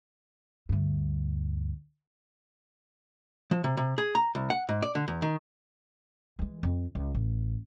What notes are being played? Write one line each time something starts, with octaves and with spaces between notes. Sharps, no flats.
D2 G2
F3
C3
C3
G#4
A#5
C2
F#5
G#2
D5
D3
E2
D#3
E3 G#3
F2
C#2
A1